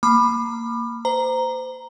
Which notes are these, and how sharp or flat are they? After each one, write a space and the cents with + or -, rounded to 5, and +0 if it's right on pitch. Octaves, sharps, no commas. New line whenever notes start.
A#3 -15 B5 +0 D6 +30
C5 -30 A#5 +0